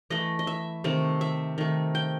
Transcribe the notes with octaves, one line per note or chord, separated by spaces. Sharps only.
E3 A3 D#5
D#5
E5
C3 D#3 A3
E5
D#3 A3
G5